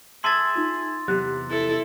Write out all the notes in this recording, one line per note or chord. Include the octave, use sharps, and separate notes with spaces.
G#4 E5 G#5 A5 C6 A6
D#4 F4
E2 C3 F#3 G4 F#6
E4 A4